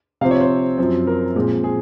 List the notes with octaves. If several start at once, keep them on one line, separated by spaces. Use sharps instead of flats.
C3 F3 C4 F5
C#5
C5
F#2 F3 C4
A#4
A#2 F3 G#3 C4
G#4